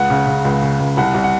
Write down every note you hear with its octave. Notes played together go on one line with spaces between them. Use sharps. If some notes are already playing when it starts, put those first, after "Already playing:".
Already playing: C#2 F#5
C#3
C#3
C#2
C#3
C#2
C2 F#5
C2
F#5